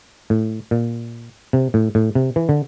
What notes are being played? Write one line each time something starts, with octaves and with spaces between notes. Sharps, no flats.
A2
A#2
C3
A2
A2
C3
E3
D3